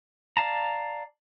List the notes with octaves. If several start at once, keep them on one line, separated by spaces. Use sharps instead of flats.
D5 F5 A5 A#5